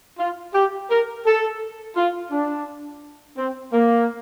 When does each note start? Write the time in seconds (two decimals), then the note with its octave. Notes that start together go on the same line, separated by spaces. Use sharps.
0.19 F4
0.54 G4
0.90 A#4
1.26 A4
1.96 F4
2.31 D4
3.38 C4
3.73 A#3